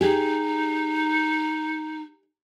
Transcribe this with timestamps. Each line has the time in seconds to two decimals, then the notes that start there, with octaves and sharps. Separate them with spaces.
0.01 D#4 G4 G#4